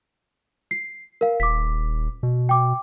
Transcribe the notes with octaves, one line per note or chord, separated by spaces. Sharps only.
C7
A#4 F5
D#1 D6 B6
B2
G5 D6